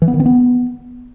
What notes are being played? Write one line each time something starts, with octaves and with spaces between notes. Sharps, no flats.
E3
B3
D#3
C4
B3